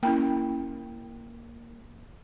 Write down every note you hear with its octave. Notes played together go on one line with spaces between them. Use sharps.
A#3 C#4 E4 G5